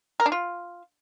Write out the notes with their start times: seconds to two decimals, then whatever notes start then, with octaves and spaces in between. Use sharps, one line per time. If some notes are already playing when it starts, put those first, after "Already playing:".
0.20 A#4
0.26 D4
0.32 F4